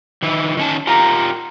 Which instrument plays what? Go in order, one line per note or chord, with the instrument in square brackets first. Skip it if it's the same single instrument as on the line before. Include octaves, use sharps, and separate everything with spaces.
[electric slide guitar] D#3 E3 E4
D#3 C#4 A5
[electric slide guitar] F4 G4 A#4 [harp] A#5